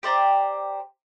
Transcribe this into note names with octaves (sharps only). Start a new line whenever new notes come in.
G4 C5 D5 A#5